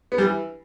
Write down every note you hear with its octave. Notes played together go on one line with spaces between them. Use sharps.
B3
G3
E3